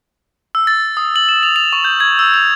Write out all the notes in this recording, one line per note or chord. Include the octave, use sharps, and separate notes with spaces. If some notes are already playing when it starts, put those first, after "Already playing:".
E6
A6
D#6
F#7
E7
F7
F7
C#6
G6
G#6
E6
F7